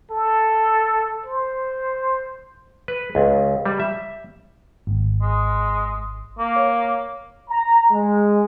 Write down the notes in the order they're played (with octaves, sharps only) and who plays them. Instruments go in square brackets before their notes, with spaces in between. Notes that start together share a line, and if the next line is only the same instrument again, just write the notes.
[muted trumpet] A4
C5
[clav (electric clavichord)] B4
C#2
G3
E5
[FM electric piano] G#1
[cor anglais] G#3
A#3
[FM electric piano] C#5
[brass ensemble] A#5
G#3